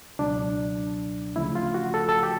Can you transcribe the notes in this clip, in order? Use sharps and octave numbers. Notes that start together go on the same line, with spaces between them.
C#2 B2 F#3 D4
D2 C#3 F3 A3 E4
F4
F#4
A4
A4
G4